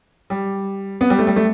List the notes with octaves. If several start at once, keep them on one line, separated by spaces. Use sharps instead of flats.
G3
B3
G3
A3
G3
A3